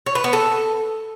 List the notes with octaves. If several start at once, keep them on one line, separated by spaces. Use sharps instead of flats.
C#5
B4
B3
A4